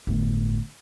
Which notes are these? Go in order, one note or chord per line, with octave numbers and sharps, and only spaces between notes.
G1 A2